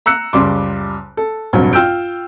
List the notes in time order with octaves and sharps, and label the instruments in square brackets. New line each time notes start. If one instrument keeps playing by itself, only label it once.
[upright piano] A#5 E6 F#6 C#7
F#1 C#2 G3 C6 D6
A4
F1 A#1 G2 F#3
F4 G5 E6 F6 G6 D7